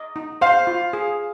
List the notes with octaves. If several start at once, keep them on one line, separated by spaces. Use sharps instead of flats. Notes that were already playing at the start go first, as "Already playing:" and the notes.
Already playing: D#5
D#4
C5 F5
F4
G#4